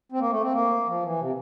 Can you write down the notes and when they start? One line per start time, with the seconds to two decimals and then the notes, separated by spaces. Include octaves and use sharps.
0.12 C4
0.19 A#3
0.30 A3
0.41 C4
0.53 A#3
0.86 F3
1.03 E3
1.20 C3